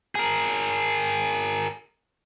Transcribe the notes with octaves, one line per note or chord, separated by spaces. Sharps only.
G#4 A#4